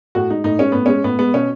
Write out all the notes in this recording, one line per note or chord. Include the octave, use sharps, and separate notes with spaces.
A2 F#4
G#3 D#4
A2 D#4
G#3 C#4
A2 B3
G#3 C#4
A2 B3
G#3 B3
B2 C#4